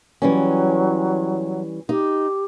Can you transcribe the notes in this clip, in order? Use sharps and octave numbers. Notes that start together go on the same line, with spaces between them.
E3 F#3 G3 C#4
D#4 G4